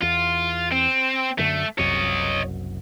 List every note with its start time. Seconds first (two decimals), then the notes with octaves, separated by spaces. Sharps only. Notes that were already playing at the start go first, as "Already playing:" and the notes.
0.02 E2 F4
0.72 C4
1.39 F#2 D3 A3
1.79 F#1 C2 F#2 C#5 D#5